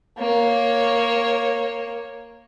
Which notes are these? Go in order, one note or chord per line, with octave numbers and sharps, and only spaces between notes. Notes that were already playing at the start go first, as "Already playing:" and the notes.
A#3 C#5